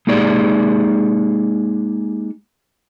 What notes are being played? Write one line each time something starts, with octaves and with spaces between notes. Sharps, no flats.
G#3 A#3 D#4 G4 G#4 D5